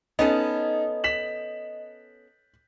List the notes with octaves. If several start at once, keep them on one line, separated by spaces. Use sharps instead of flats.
B3 C#4 D#4 A4 D#5
B6 E7 F#7